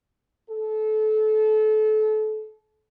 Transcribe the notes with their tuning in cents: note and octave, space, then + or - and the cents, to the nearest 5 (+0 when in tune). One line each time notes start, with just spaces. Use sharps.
A4 -30